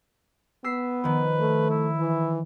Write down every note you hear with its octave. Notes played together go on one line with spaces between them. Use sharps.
B3 E6 B6 C7
D#3 F3 B4
A3
E4
E3